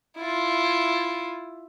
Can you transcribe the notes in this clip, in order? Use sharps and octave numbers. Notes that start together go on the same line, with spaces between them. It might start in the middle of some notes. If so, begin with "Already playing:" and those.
E4 F4